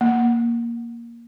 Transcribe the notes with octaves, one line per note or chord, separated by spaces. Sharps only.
A#3